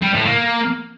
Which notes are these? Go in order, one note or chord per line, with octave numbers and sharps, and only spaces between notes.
G3
A2
A#3